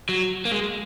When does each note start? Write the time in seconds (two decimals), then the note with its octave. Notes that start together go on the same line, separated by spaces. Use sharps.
0.09 F#3
0.45 A#3
0.52 G#3